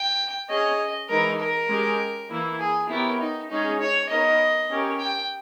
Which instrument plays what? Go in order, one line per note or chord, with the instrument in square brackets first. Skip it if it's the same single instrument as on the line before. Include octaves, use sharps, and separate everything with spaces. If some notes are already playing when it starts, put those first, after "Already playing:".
Already playing: [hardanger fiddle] G5
[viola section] C#4 G#4 C#5 [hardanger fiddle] D#5
[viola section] E3 G#3 D#4 [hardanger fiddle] A#4
[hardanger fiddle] A#4
[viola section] G#3 C#4 G4
E3 A#3 E4
[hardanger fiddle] G#4
[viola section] B3 G4 A#4 C#5 [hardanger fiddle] E4
[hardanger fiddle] D#4
[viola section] G#3 C#4 G#4 C#5 [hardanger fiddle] D#4
[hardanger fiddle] C#5
[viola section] B3 D#4 A#4 C#5 [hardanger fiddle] D#5
[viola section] C#4 G4 A#4 C#5
[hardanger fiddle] G5